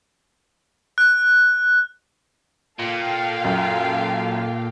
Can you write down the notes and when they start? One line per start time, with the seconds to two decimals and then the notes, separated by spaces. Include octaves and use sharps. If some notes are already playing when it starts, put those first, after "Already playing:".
0.98 F#6
2.79 A#2 A4 F5 G5
3.45 F#2